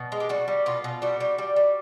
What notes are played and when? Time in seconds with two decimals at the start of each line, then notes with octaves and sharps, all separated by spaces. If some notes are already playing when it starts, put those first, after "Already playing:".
Already playing: B2
0.12 G#3
0.20 G4
0.29 G3 F#4
0.48 G3
0.66 B2 F4
0.84 B2
1.02 G3 F#4
1.20 G3
1.38 G3
1.56 G3